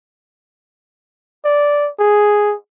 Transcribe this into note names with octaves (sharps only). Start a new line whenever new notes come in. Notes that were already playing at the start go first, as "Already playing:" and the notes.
D5
G#4